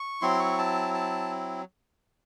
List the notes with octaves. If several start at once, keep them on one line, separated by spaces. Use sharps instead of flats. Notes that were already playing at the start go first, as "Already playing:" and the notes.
Already playing: C#6
F#3 C4 E4 C6
C#6
A5
A5